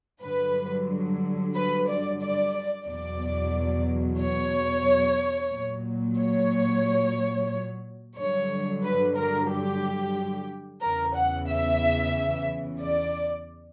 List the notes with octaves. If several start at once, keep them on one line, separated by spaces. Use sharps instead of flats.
G2 D3 F#3 B4
B4
D5
D5
E2 B2 F#3 D5
C#5
A#2 F#3
C#5
G2 D3 F#3 C#5
B4
A#4
G4
E2 C#3 E3 A#4
F#5
E5
D5